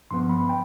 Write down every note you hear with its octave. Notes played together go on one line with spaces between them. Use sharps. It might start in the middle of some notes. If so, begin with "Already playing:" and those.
G2 F3 B3 C6
B5
G5